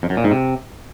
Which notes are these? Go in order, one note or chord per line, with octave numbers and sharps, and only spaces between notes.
F2
F#2
A#2
G#2
C3